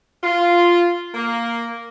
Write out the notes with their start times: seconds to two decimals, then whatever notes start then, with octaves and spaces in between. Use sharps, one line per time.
0.23 F4
1.15 A#3